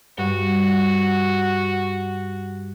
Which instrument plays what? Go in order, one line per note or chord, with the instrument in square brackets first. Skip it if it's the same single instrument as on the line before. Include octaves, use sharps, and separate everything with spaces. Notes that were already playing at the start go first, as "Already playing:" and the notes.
[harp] G2 [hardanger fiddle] F#4